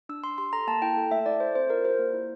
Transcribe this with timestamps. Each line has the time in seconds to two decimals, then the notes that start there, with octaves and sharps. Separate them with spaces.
0.09 D4 E6
0.24 D4 C6
0.38 G4 C6
0.53 A4 A#5
0.67 A#3 A5
0.82 E4 G5
0.97 A4
1.11 A3 E5
1.26 E4 D5
1.40 A4 C5
1.55 C4 C5
1.70 F4 A#4
1.84 G4 C5
1.99 A#3
2.14 E4